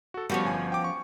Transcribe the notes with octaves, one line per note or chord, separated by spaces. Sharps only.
F#4 A4
F3 G3 B3 C#4 F#4
G1 G#5
G5 D6
C#6